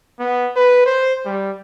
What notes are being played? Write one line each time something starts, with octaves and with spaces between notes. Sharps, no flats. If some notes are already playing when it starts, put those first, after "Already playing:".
B3
B4
C5
G3